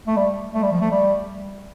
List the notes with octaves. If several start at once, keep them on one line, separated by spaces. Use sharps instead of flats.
A3
G3
A3
G3
F3
A3
G3